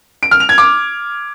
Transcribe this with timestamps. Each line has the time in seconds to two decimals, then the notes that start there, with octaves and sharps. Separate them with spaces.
0.23 D7
0.31 F6
0.40 F7
0.49 G#6
0.58 D6